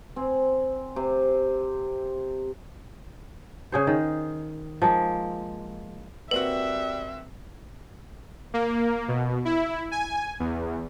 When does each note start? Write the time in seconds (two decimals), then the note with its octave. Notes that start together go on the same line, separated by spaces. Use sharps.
0.16 C4 G#5
0.96 C3
3.72 C#3 G#4 C5
3.87 D#3
4.82 F3 G#3 A#3
6.31 G3 A#3 C4 F#4 B4 E5
8.54 A#3
9.08 B2
9.45 E4
9.91 G#5
10.40 E2